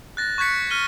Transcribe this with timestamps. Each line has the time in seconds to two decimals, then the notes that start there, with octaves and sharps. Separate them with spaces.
0.17 F#6 A6 A#6
0.38 C#6 F#6 G#6 B6 C#7
0.71 F6 D#7 G7